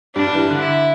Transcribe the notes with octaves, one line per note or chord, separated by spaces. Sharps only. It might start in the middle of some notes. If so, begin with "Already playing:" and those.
G2 G3 D4
G2 G3
E3
G2 G3
D3
E4